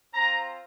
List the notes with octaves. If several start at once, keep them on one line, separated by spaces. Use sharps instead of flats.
C4 F4 A#5